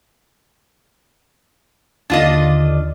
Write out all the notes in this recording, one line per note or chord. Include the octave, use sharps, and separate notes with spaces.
D#2 D3 D4 F4 D5 D#5